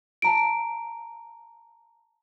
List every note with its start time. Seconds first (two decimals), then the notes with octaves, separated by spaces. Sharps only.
0.22 A5 A#5 D7